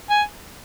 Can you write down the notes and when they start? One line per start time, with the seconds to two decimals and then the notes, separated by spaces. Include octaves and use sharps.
0.10 G#5